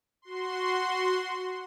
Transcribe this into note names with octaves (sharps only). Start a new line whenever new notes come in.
F#4 C6